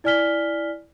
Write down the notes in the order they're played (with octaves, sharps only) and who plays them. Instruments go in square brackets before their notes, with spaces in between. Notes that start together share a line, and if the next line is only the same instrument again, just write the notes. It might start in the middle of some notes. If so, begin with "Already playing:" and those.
[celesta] E4 D5 G#5 F6 B6 G7